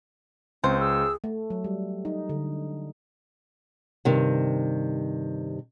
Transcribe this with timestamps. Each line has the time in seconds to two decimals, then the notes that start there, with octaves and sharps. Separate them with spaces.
0.64 C#2 C4 C5
0.80 G#4 E6
1.24 A3
1.50 F#3
1.64 G3
2.05 D#4
2.29 D3
4.05 G2 C3 D#3